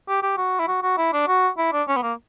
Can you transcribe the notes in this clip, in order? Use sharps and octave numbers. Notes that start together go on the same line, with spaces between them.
G4
G4
F#4
E4
F#4
F#4
E4
D4
F#4
E4
D4
C#4
B3
A#3